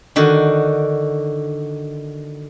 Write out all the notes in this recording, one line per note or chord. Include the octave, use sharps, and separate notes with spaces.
D3 D#3 F#4